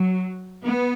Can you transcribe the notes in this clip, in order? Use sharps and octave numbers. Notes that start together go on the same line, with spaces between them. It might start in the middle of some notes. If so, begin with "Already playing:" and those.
Already playing: F#3
B3